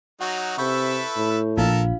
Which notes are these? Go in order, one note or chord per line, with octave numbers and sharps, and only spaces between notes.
F#3 D#4 F#4 F#5
C3 E4 A4 B4 C#6 G6
A2
A#1 D4 F4 A4 A#4 F5 A5